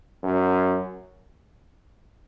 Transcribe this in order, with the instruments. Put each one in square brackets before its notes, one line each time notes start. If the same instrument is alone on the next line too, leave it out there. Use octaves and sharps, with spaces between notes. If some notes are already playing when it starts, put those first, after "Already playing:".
[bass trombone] F#2